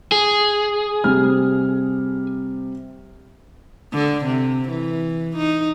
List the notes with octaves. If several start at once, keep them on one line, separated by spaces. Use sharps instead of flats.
G#4
C3 G3 F6
D3
C3
E3
D#4